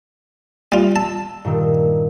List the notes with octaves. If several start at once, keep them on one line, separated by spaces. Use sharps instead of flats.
G3 F4
A5 E6
G2 A#2 D#3